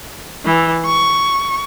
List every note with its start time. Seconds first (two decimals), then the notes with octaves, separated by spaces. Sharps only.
0.45 E3
0.85 C#6